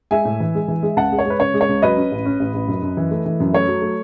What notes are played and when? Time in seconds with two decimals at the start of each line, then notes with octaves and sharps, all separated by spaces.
0.11 G#3 E5 G#5
0.25 A2
0.40 E3
0.55 G#3
0.68 E3
0.83 G#3
0.97 C#2 F#5 A5
1.12 G#3
1.19 C#5
1.25 G#3
1.30 B4
1.39 C#3 C#5
1.54 G#3
1.61 C#5
1.69 C#2
1.82 F#3 B4 D#5
1.97 C#4
2.11 A1
2.25 C#4
2.39 A1
2.54 A1
2.68 F#2
2.82 F#2
2.97 E3
3.11 A3
3.26 E3
3.40 F#2
3.54 A3 C#5
3.68 F#3
3.82 A3